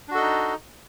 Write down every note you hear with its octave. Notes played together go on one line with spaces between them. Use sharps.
D4 D#4 F#4 A4 D#5